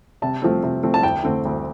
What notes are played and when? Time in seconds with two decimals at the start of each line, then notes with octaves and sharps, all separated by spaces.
0.22 C3 A5
0.42 F3 A3 C4
0.63 C3
0.83 F3 A3 C4
0.94 A5
1.03 D2 G5
1.24 D3 A3 C4
1.45 D2